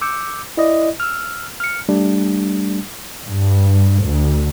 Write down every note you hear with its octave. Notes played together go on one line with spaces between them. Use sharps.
D6 E6 G6 C#7
E4 D5 D#5
E6 F6
F6 C#7
G3 A3 D4
G2
D2